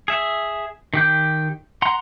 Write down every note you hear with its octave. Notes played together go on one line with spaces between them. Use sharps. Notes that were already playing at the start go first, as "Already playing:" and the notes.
G#4 E5
D#3 G4 G6
F#5 A#5 C6